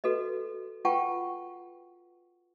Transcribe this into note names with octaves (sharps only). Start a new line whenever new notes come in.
F#4 A4 B4 D#5
F4 B4 F#5 G5 A5 C#6